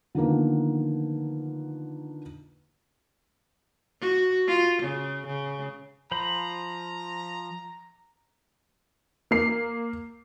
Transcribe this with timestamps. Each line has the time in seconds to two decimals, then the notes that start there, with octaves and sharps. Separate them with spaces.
0.15 D3 D#3 F3 A#3 B3
4.01 F#4
4.48 F4
4.82 C#3
5.26 C#3
6.12 F3 C5 A#5 B5
9.31 A#3 C7